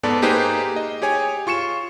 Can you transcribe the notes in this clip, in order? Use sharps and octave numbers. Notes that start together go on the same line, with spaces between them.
G#2 B3 A4 D5 A5
A#3 D#4 G4 G#4 B4 C5
D#5
G4 G#4 C#5 G#5
F4 C#6 C#7 E7